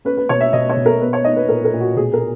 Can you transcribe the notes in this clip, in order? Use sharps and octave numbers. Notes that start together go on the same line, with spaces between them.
C#4 B4
B4
B2 C#5
E5
B2 D#5
C#5
B2
A#4
B3 B4
C#5
D#4 D#5
B4
A#2 A#4
A#4
A#2
F#4
B2 G#4
A#4